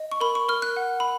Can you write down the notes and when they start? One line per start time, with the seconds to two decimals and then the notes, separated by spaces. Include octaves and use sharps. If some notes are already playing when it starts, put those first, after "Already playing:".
Already playing: D#5
0.11 C#6
0.21 A#4 B5
0.35 C#6
0.49 A#4 F6
0.62 F#6
0.77 F#5
1.00 B5